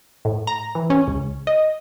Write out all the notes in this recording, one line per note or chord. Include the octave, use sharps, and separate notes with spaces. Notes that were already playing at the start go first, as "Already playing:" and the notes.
A2
A#5
E3
C#4
C#2
D#5